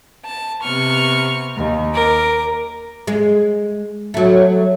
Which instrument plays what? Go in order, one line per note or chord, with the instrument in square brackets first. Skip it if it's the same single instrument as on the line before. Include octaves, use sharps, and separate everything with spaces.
[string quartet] A5
C3 B3 C#6 F6
D#2
A#4 D6
[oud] G#3
F#3 A3